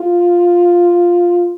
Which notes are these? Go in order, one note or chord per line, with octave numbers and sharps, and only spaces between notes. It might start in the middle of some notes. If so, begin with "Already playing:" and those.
Already playing: F4